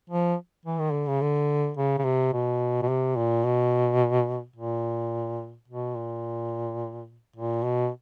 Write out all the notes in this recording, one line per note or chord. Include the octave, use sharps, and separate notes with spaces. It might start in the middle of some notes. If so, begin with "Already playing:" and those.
F3
E3
D#3
D3
C#3
D3
C#3
C#3
C3
B2
B2
C3
A#2
B2
A#2
B2
A#2
A#2
B2